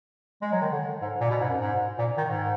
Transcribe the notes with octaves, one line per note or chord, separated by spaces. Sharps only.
G#3
F#3
D#3
D3
G#2
A#2
B2
G#2
F#2
G#2
A#2
D#3
G#2